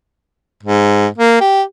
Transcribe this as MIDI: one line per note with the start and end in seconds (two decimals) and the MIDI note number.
0.63 1.07 44
1.18 1.40 58
1.40 1.62 67